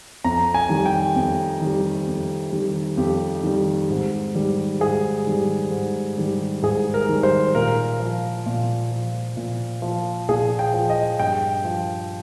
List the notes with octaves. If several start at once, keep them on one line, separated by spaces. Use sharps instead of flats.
F2 A#5
G#5
D#3 G3
G5
F2
D#3 G3
F2
D#3 G3
F2 G4
D#3 G3
G#2
D#3 G3
G#2 G#4
D#3 G3
G#2
D#3 G3
G#2 G#4
A#4
D#3 G3
C5
A#2 A#4
F3
A#2
F3
A#2
F3
A#2 G#4
G5
F3
D#5
G2 G5
F3